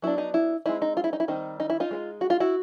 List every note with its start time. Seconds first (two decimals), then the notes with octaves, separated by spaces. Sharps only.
0.02 F#3 B3 D4 E4
0.18 D#4
0.34 E4
0.66 G#3 C4 D#4 E4
0.82 D#4
0.97 F4
1.04 E4
1.13 D#4
1.20 E4
1.28 D#3 G3 C4 D#4
1.60 D#4
1.70 E4
1.80 D#4 F4
1.91 G#3 C4 D#4
2.21 F#4
2.30 F4
2.40 E4 F#4